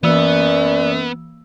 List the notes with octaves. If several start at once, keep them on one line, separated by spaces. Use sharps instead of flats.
F#2 E3 A#3 B3 D5 E6